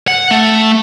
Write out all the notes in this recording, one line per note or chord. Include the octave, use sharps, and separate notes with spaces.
F#5
A3